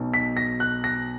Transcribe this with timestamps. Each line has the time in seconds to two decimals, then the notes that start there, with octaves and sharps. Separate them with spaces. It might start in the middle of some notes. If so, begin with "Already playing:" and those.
Already playing: B1 B2
0.14 B6
0.37 A#6
0.60 F#6
0.84 A#6